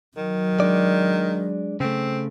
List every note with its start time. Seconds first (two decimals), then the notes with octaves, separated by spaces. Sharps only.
0.17 D#3 F#3
0.60 G#3 D4 D5
1.80 C#3 A3 C4